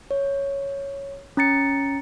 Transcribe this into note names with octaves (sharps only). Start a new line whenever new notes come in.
C#5
C#4 A#5 A6 C#7